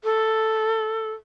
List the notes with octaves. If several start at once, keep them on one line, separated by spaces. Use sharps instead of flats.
A4